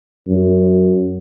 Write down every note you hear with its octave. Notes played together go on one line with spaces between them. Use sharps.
F#2